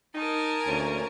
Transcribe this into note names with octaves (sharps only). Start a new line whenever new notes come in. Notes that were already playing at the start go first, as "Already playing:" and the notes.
D#4 A#4 G#5 A5
D2 A#2 C#4